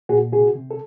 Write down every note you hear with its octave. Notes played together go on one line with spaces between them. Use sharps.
A#2 F#4 G#4
C3 F#4 G#4
C3
A4